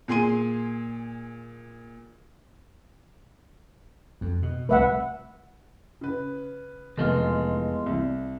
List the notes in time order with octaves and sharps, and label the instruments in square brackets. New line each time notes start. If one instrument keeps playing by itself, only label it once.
[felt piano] A#2 G#4 G#5 C6 D#7
[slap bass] F2
B2
[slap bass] C2 A3 [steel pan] B4 E5 F#5
[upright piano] C#3 B4
[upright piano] F1 [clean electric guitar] E2 G#3 F4
[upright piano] C2